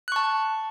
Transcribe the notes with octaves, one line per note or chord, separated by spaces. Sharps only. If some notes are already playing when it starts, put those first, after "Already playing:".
A5 C#6 F#6